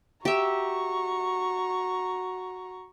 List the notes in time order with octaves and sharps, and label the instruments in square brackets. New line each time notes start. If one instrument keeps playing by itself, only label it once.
[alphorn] F#4 [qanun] G4 E5 [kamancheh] A#5 C#6